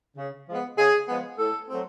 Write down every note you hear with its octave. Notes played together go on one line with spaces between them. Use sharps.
C#3
F3 G#3 B3
C#3 G#4
F3 G#3 B3
A2 A4
F#3 A3 C4